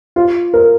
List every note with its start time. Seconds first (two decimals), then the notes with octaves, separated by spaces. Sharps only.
0.16 F4
0.54 A#4